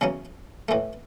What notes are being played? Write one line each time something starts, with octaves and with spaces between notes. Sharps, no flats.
E2 C#3 F#3 C#4
A2 E3 A3